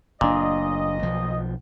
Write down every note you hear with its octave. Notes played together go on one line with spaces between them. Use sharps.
F#1 A#2 D4 D#5
B1 F3